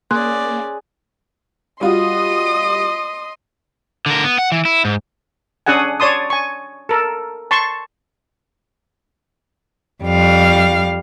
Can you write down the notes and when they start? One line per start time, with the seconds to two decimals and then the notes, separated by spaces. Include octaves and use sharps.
0.11 A#3 C#4 G#4 D5 C6 F#6
1.81 G3 F4 F#4 D#5 C6 D#6
4.06 D3 A#4
4.24 B3
4.38 F#5
4.52 E3
4.65 E4
4.85 G#2
5.66 C#4 D4 G#4 F#5 G#5
6.00 C#5 D5 A5 C6 D#6
6.30 G#5 C#6
6.89 A4 A#4
7.51 A5 C6 C#6
10.03 F2 G3 F5